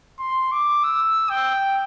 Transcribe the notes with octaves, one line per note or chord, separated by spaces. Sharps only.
C6
D6
E6
G5